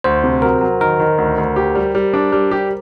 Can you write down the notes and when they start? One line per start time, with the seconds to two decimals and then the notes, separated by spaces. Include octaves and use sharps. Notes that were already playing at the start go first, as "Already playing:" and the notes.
0.04 D2 C5
0.24 C3
0.42 F#3 A#4
0.61 F#3
0.80 D#3 A#4
1.00 D#3
1.18 D2
1.38 D2
1.56 G4
1.75 G3
1.95 G3
2.14 D4
2.32 G3
2.51 G4